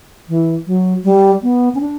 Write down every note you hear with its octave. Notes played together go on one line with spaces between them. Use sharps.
E3
F#3
G3
B3
C#4
D4